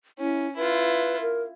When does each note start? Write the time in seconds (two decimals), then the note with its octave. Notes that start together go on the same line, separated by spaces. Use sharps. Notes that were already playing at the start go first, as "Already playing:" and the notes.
0.19 C#4 E4
0.56 E4 F4 B4
1.21 A#4